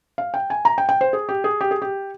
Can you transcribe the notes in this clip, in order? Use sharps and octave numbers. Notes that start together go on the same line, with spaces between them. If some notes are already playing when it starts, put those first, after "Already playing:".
F5
G5
G#5
A#5
G5
G5
C5
G#4
G4
G#4
G4
G#4
G4